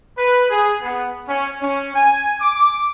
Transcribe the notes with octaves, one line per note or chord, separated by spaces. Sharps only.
B4
G#4
B3
C#4
C#4
G#5
D6